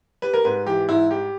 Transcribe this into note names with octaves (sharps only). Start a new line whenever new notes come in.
G3 B4
A#4
G#2 B4
E3 G4
G#2 E4
G3 G4